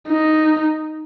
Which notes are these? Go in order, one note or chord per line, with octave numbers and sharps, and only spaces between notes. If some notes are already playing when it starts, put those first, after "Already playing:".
D#4